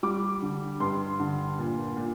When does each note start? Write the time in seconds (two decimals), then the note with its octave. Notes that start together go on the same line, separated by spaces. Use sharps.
0.03 G3 D6
0.42 D3
0.80 G2 C6
1.20 D3
1.58 A#2
1.96 A#2